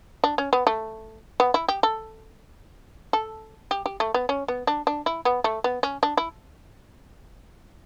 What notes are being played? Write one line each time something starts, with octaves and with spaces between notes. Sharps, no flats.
D4
C#4
B3
A3
B3
E4
G4
A4
A4
G4
G4
A3
B3
C#4
B3
D4
D4
E4
B3
A3
B3
C#4
D4
E4